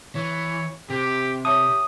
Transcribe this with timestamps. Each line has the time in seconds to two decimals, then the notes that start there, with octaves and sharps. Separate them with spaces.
0.15 E3 C#5
0.90 C3 G4
1.45 G4 C#5 E5 A5 D#6